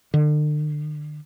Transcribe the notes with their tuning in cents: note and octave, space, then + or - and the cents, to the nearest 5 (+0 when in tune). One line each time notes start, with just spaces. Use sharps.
D3 +40